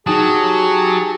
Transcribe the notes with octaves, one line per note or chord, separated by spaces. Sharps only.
F#3 D#4 G4 G#4 G#5 A5 D#6